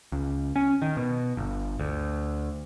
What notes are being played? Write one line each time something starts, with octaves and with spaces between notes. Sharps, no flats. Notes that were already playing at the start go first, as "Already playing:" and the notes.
C#2
C#4
D#3
B2
G1
D2